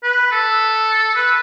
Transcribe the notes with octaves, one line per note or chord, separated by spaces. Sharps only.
B4
A4
B4